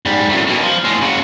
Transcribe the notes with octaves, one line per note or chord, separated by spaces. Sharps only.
G#2 G3
F#2 A2
B2 A#3
F3
A2 G#3
C#3 F#4